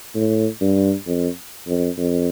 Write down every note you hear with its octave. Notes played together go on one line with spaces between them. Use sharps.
A2
G2
F2
F2
F2